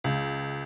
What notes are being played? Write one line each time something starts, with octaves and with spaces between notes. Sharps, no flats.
C#2